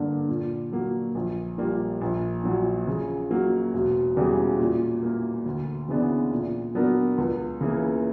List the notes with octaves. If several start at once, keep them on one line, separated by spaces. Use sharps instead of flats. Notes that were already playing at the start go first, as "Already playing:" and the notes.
Already playing: G2 D3 A#3 D4
A#2
F#3 A#3
A#1
A#2 G3 A#3
A#1
A#2 F#3
C#3
F#3 A#3
E1
E2 C#3 E3 G3
A#2
A#3 E4
D2
C#3 E3 B3 D4
A#2
F#3 B3 D4 A#4
C#2
C#3 E3 A#3